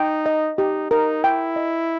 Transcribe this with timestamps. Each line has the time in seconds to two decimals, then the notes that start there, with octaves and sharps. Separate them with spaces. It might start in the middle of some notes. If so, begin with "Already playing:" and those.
Already playing: D#4 G5
0.26 D#5
0.58 D#4 G4
0.91 D#4 A#4
1.23 E4 G5
1.56 D#5